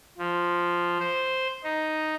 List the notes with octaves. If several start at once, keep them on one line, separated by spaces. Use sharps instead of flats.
F3
C5
D#4